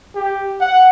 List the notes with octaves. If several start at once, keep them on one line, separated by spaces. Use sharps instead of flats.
G4
F#5